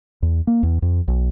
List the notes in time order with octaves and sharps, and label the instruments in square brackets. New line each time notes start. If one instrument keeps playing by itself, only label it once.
[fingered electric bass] E2
A#3
E2
F2
B1